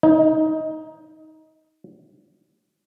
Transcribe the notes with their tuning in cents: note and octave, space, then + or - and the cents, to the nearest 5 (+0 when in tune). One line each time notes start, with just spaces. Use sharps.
D#4 +15